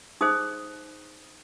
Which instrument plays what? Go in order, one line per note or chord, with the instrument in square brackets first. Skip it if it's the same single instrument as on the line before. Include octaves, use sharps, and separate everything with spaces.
[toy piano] D#4 G#4 C5 D#6